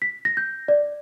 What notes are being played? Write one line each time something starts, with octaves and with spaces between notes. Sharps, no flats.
B6
A#6
G6
D5